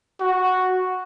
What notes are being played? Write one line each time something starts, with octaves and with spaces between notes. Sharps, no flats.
F#4